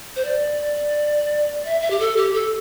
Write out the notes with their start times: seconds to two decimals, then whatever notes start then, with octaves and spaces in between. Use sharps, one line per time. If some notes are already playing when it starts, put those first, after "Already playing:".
0.16 C5
0.25 D5
1.65 E5
1.81 E5
1.91 G4
2.00 A4
2.17 G4
2.34 A4